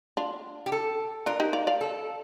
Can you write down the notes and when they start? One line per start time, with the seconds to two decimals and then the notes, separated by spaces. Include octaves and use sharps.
0.17 D4 F4
0.66 G4
0.72 A4
1.26 D4 F4 A#4
1.40 D#4 G4
1.53 D5 F5
1.67 D5 F5
1.81 A4